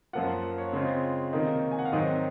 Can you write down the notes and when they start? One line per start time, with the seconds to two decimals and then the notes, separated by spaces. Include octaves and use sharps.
0.13 F#2 F3 A#3 F4 F#5
0.58 C#5
0.73 C#3 G#3 C4 F4
1.33 C3 D#3 A#3 D#4
1.71 G#5
1.79 F#5
1.85 F5
1.92 G#2 D#3 F#3 C4 D#5